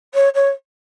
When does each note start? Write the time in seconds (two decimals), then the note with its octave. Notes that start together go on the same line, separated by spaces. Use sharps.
0.14 C#5
0.34 C#5